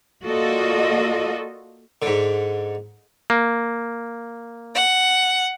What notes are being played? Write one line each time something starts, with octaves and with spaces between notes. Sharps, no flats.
A#3 F4 F#4 A4 D5 D#5
G#2 D3
A#3
F#5